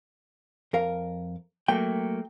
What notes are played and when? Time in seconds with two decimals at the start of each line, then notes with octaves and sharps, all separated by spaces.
0.73 F2 A#4 F5
1.68 F#3 A3 A#3 G5